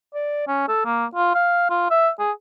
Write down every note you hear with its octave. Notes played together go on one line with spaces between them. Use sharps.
D5
C#4
A4
A#3
F4
F5
F4
E5
G#4